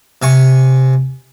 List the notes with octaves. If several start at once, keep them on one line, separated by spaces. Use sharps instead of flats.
C3 G#5 C#6